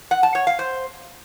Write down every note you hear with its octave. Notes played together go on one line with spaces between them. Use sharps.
F#5
A5
C#5
F5
C5